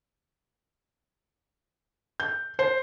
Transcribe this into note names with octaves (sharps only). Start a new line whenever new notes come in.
G6
C5